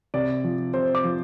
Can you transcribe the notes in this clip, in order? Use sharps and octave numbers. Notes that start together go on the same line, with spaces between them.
C3 D5
F3
C3 C5
D6
F3